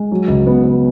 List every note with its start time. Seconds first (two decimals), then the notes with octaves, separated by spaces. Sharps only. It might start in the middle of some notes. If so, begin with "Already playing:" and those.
Already playing: G#3
0.12 F#3
0.28 C#2
0.46 B3
0.64 B3